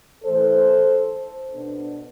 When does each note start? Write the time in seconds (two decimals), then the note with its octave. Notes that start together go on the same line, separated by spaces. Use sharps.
0.24 A2 E3 A3 A4 C5
1.53 B2 B3 D4